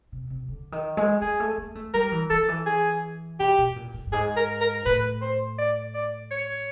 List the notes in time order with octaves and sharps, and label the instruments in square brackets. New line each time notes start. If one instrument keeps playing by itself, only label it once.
[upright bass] C3
C3
D3
D#3
G#3
[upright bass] G#3 [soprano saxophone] G#4
[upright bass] A3
A#3
A3
[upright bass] G3 [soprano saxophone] A#4
[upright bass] E3
[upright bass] D#3 [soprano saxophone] A4
[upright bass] E3
[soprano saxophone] G#4
[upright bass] B2 [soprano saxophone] G4
[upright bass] B2
A#2
A2
G2
[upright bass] G#2 [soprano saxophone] G#4
[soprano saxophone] A#4
A#4
[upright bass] A2 [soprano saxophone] B4
[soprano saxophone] C5
D5
D5
C#5